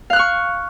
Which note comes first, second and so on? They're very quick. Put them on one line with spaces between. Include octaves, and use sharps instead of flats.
F5 F#6 F6 C#6